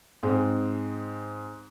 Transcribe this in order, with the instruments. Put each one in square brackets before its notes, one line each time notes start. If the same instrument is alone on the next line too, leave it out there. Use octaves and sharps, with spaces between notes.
[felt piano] G#2 G#3 C4